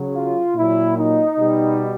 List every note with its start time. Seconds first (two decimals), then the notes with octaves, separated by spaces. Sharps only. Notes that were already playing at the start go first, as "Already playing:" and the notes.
Already playing: C#3 F#3
0.14 F4
0.55 A#2 F#3 E4
0.97 D#4
1.37 B2 G3